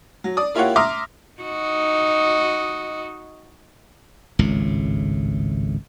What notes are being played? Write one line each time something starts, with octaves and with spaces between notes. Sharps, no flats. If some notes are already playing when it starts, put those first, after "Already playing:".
F#3
D5 D#6
A#3 E4 F4 G4 C#5 F#5
E5 A#5 C6 D6 D#6 F6
D#4 F#4 D#5
G#1 C#2 A2